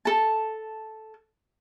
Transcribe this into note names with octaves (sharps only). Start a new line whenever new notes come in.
A4 A5